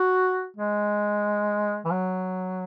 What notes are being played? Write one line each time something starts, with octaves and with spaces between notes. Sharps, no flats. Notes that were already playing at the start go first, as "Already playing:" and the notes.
Already playing: F#4
G#3
E3
F#3